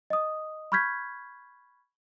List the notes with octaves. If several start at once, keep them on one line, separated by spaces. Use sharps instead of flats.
D#5 D#6
B5 C#6 F6 G6 G#6 B6